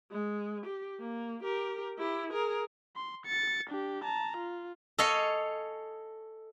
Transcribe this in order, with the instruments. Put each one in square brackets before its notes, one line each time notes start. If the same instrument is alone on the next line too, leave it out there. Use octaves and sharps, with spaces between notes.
[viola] G#3
G4
A#3
G4 A#4
E4 G4
G#4 A#4
[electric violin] C6
A6 C#7
D4 G4
A5 A#5
F4
[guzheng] A4 C#5 D#5 F5 G#5